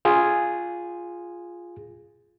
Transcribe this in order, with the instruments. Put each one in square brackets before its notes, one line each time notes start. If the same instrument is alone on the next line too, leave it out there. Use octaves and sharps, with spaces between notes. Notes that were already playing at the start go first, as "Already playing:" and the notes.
[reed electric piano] F4 G#4